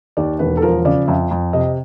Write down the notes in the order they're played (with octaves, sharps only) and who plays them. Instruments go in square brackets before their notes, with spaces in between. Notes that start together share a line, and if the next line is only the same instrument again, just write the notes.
[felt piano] D#2 D5
E1 B4
A4
F3 A#4
C#3 D5
F2 E5
F2
C3 D#5